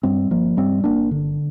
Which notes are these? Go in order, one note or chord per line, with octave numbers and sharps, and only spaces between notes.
G2 G3 C4
G1 F3 A#3
G2 G3 C4
G1 A#3 D4
D3